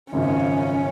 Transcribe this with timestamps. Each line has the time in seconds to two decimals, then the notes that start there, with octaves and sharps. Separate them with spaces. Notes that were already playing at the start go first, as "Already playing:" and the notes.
0.12 G#1 F#2 C#3 F3 C#4